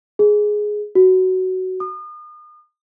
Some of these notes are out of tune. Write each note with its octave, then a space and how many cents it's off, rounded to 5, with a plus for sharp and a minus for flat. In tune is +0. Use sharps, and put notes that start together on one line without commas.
G#4 +10
F#4 +10
D#6 -40